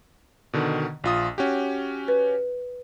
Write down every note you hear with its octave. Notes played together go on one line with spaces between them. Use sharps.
B2 D3 D#3
A#1 F4 D#6
C#4 F#4 G4
B4